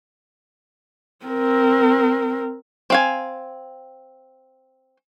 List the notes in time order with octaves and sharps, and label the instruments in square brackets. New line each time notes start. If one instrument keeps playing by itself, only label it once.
[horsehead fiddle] C4 A#4
[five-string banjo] C4 F5 G#5